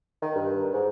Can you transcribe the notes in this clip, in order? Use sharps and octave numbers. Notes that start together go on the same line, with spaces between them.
D#3
G2
G#2